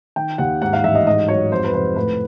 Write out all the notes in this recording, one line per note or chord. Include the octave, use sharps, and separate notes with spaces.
D#3 G5
D#2 F#5
G#2 F#5
F5
A1 E5
D#5
G#2 D#5
F#3 C#5
F2 C5
B4
F1 C5
A2 B4